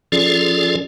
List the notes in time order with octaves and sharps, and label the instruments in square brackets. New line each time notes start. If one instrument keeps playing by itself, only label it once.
[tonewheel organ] F3 C#4 F4 G#4 A4 D5